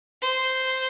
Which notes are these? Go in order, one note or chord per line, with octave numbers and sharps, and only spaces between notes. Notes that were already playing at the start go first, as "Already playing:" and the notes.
C5